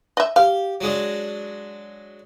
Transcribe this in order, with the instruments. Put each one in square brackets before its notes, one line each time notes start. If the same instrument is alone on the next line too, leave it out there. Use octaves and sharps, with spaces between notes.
[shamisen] D#5 E5
[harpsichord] G4 [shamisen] F5
[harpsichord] F#3 G#3 D4